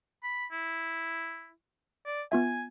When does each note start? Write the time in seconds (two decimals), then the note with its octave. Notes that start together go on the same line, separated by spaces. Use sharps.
0.23 B5
0.52 E4
2.06 D5
2.32 B3 F4 E5 G#5